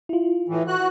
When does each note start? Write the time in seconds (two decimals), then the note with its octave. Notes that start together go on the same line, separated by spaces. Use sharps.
0.09 E4 F4
0.49 A2 E3
0.68 F#4 F#6